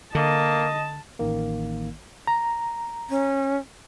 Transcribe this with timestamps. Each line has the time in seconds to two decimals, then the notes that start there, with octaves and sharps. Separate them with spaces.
0.15 D3 A#3 D#5 A5
1.19 A1 D#3 A#3
2.27 A#5
3.10 C#4